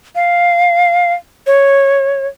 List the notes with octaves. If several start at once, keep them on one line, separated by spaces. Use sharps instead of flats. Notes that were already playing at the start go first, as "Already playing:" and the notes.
F5
C#5